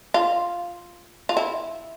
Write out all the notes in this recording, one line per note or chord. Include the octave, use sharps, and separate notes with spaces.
F4
F4
E4